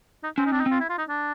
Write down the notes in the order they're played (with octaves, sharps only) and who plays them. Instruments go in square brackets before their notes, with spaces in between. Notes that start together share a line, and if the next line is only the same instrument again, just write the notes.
[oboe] D#4
[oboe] C4 [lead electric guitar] C#4
[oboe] D#4
[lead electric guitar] C4 [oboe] D4
[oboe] D#4
[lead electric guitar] C4
[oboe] F4
E4
F4
D#4
D4